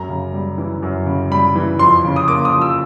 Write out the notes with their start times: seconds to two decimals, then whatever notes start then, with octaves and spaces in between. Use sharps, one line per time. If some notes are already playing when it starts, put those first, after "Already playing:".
Already playing: F#2 A#5
0.09 C#3
0.33 G3
0.58 E3
0.83 F#2
1.06 C#3
1.31 G3 B5
1.56 E3
1.79 F2 C6
2.04 C#3
2.16 D#6
2.28 A#3 D6
2.45 D#6
2.53 F3
2.61 E6